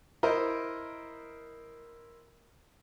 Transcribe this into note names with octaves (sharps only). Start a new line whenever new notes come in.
E4 A#4 C5 D#5